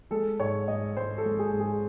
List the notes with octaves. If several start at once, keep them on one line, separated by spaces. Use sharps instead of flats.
G#3 A4
G#2 C#5
G#2 D#5
G#2 C5
A4
G#3
G#4
G#2
G#4